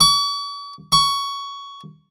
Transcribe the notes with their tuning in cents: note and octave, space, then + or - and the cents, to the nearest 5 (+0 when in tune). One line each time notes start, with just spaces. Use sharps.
C#6 +45
C#6 +15